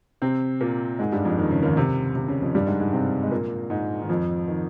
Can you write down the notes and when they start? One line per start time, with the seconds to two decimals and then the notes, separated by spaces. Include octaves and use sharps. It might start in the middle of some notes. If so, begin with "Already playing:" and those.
0.22 C3 C4
0.60 A#2 A#3
0.99 G#2 G#3
1.12 G2 G3
1.25 F2 F3
1.38 D#3
1.51 C#3
1.63 D#2 D#3
1.77 C3
2.15 C3
2.28 C#3
2.41 F2 F3
2.55 G2 G3
2.67 G#2 G#3
2.80 G#2 G#3
2.93 C3 C4
3.23 G#3
3.31 A#2 A#3
3.70 G#2 G#3
4.02 D#3
4.09 F2 F3
4.48 D#3